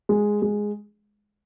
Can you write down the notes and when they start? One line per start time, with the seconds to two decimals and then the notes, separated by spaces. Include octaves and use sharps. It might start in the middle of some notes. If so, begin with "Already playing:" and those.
0.09 G#3
0.42 G#3